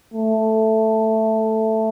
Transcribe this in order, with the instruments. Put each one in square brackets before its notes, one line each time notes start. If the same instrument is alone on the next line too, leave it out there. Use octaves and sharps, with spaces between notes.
[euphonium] A3